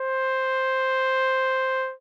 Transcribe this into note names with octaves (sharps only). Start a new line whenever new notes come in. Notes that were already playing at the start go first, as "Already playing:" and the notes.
Already playing: C5